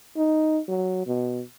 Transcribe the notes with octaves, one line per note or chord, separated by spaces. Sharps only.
D#4
F#3
B2